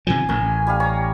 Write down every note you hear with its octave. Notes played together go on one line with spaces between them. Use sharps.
C3 D#3 F3 G#5
A1 C#4 A#4
G3 G4 F5
C#5 A#5